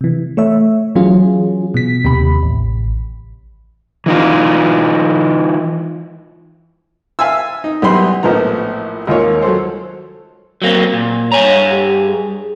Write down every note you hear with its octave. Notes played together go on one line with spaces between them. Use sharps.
C3 E3
A3 C#5 E5
E3 F#3 C#4 F4 G#4
B2 B6
D#2 C3 G4 B5
A1
E3 D#4 F4
E5 F5 G#5 A5 E6
D#4
B1 F#2 E3 G3 B5 C6
A#1 A2 F3 B3 A#5
G#1 D#2 A#3 F4 C#5
F#3 A4 C5
F#3 A#3 C4
A#2
G2 C#5 G#5 A#5
G4
G#4